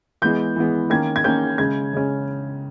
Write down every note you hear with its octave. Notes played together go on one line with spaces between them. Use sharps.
E3 G#3 B3 G6
E3 G#3 B3
D#3 A#3 C#4 G#6
G#6
D#3 A#3 C#4 G6
C#3 G#3 C#4 G#6
C#3 G#3 C#4